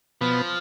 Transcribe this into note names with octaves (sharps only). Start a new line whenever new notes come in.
B2 F3 B3